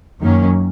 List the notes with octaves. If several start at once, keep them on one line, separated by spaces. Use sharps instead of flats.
F#2 D#3 F#3 A#3 C#4